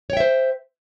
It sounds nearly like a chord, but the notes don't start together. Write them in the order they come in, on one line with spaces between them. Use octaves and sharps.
C#5 G5 E5 C5